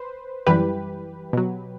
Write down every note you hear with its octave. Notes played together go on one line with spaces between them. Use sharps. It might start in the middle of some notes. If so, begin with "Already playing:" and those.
Already playing: B4 C5
F#2 E3 G3 G4 B4
B2 F#3